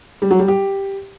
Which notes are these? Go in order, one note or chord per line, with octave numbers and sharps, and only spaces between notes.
G3
F#3
G3
G4